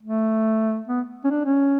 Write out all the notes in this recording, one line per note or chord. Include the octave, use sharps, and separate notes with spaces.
A3
B3
C#4
D4
C#4